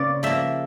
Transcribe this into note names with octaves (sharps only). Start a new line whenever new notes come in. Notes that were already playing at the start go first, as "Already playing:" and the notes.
Already playing: C#3 A#3 B4 D5
F3 A#3 E5